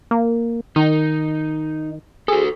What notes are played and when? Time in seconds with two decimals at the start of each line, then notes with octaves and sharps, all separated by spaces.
0.11 A#3
0.76 D#3 D#4
2.28 F#4 G#4 A4